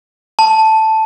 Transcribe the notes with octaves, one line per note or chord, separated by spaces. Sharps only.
A5